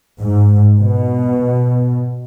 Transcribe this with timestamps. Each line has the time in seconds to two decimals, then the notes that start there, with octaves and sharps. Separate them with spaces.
0.21 G#2
0.79 B2